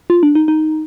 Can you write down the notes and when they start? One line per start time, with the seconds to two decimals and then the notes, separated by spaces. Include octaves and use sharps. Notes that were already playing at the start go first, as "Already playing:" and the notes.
0.10 F4
0.23 D4
0.35 D#4
0.48 D#4